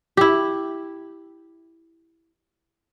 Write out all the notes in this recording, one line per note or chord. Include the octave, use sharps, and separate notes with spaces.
E4 G4